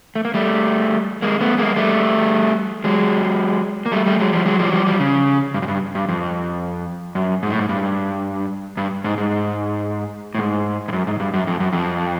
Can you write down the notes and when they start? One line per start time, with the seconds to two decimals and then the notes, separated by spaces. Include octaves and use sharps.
0.15 A3
0.25 A#3
0.34 G3 A3
1.22 G#3 A#3
1.40 A3 B3
1.58 G#3 A#3
1.76 G3 A3
2.84 F#3 G#3
3.86 A#3
3.92 G3 A3
4.06 G3 A3
4.20 F#3 G#3
4.33 F3 G3
4.46 F#3 G#3
4.59 F3 G3
4.69 F#3
4.73 F3 G3
4.87 F3 G3
5.00 C#3
5.54 G2
5.62 F#2
5.68 G2
5.95 G2
6.09 F2
7.15 F#2
7.43 G#2
7.50 A2
7.59 G#2
7.69 G2
8.77 G2
9.04 G#2
9.18 G#2
10.35 A2
10.39 G#2
10.88 G2
10.93 F#2
11.07 G#2
11.20 G2
11.33 F#2
11.47 F2
11.60 F#2
11.73 F2